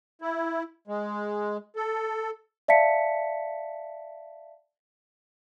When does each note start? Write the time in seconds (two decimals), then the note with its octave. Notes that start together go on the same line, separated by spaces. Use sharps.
0.22 E4
0.87 G#3
1.76 A4
2.68 D5 E5 F5 A5 B6 C#7